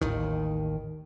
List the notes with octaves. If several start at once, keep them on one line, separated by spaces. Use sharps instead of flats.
A1 D#2 D#3